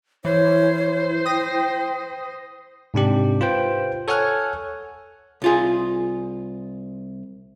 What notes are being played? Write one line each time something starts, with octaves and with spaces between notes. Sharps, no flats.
E3 E4 C5 C#5
G5 D#6 A#6
G#2 C3 D4 G4
F4 B4 C5 G5
A4 C#5 F#5 G#5 F6 F#6
C2 F4 G#4